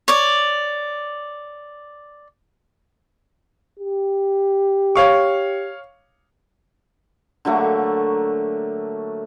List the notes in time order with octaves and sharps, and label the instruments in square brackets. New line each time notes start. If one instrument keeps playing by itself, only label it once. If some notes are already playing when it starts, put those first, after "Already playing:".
[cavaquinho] C#5 D5
[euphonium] G4
[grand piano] C#5 F5 C#6
[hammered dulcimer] D3 F#3 A3 A#3